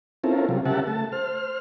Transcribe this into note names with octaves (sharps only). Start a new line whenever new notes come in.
C4 C#4 E4 F4 A4 A#4
C3 F#3 G3 F4
C#3 G4 A#4 E5 F#5 A5
A3 A5
C5 F6